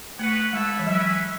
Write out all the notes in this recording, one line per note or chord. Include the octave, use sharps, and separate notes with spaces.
A3 B3 F#4 B4 F#5
G#3 B3 E4 A4 E5
E3
F#3 C#4 E4 B4 E5